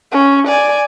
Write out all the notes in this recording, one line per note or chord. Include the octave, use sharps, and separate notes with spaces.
C#4
D5 G#5